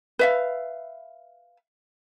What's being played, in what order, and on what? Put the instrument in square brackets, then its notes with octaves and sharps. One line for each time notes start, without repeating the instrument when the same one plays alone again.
[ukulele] B4 E5 F5